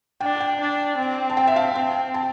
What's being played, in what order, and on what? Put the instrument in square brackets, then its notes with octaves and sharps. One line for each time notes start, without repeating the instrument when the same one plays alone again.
[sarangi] D4 [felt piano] G5
[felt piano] G5
[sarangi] D4
C4
[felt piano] A5
G5
E5
F5
[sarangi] C4 [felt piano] G5
[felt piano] A5